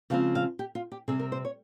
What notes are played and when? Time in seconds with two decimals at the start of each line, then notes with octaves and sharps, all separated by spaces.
0.10 C#3 F3 G#3 C4 F5
0.35 F5
0.59 G4
0.75 F4
0.92 G4
1.08 C3 G3 C4 G#4
1.20 A#4
1.32 C5
1.45 C#5